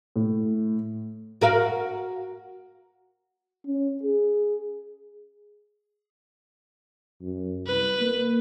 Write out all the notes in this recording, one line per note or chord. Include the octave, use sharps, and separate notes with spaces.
A2
F#4 A#4 F5
C#4
G#4
F#2
C2 B4
A#3